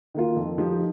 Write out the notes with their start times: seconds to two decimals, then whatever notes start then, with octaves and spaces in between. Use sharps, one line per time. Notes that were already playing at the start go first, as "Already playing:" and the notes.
0.14 D#3 A#3 F4
0.36 F2
0.58 F3 D#4 G4